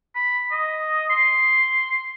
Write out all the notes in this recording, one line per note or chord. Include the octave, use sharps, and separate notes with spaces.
B5
D#5
C6